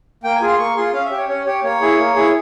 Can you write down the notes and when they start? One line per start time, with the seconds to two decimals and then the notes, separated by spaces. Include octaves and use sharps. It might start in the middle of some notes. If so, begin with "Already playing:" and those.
0.24 A#3 G5
0.35 G#5
0.41 F4 G#4
0.48 C6
0.58 A#3 C#6
0.76 F4 G#4 C6
0.93 C#4 F5
1.05 E5
1.11 G4
1.18 C#5
1.28 C#4 C#5
1.46 G4 C#5
1.63 A#3 C#5
1.81 E4 G#4
1.98 A#3
2.16 E4 G#4